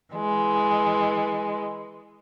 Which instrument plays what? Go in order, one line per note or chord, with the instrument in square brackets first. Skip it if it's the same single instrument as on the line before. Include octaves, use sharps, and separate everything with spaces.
[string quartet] E3 G#3